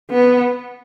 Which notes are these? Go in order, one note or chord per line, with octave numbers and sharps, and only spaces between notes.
B3